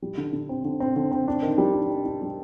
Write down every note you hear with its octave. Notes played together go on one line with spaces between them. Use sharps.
G3
D3
D3
C4
D3
C4
D3
C4
D4
D#3
G3
D4
D4
D4
G3